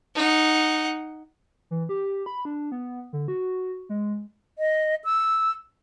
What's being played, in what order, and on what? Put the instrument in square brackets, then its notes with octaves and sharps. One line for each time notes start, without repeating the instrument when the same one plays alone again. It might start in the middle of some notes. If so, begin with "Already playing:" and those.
[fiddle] D#4 F#5
[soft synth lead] E3
G4
B5
D4
B3
D3
F#4
G#3
[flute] D#5
E6